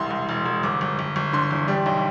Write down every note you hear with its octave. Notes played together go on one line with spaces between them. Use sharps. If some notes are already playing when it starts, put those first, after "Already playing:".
Already playing: E1 C2 C6
C2
E1
E1
G1 D6
G1
G1
G1
D3 C6
E2
G3
B1